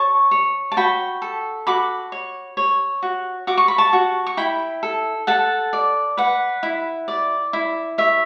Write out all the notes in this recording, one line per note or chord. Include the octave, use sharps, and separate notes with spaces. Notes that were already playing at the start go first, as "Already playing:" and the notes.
Already playing: C#5 A5 C#6
C#5
A5
F#4 G5 B5
A4
F#4 B5 D6
C#5
C#5
F#4
F#4 D6
C#6
B5
A5 C#6
F#4
C#6
E4 G5 B5
A4
A4 F#5 A5
D5
B4 F#5
E4
D5
E4
C#5 E5